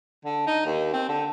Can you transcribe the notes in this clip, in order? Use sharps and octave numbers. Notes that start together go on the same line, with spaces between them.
D3
D#4
D#2
C4
D3